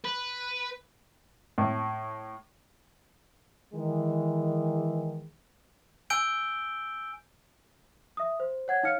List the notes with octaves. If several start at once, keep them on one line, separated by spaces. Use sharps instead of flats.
B4
A2
D#3 E3 G#3
G#5 E6 G6 D7 G7
E5 D#6
C5
C#5 F#5 G#6
D#4 C#5 F5 F6 C#7